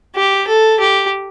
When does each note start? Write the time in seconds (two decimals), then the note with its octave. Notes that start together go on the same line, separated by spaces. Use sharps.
0.16 G4
0.47 A4
0.79 G4